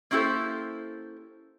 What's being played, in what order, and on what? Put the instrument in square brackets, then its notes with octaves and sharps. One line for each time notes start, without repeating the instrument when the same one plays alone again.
[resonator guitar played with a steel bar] A#3 C#4 E4 G4 A4 C5